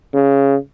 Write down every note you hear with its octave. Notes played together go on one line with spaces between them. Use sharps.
C#3